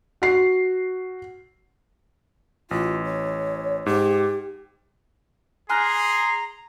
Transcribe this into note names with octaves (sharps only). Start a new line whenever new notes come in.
F#4 C7
A1 F4
C#5
G#2 G4
G#4 G#5 A#5 C6 F6 F#6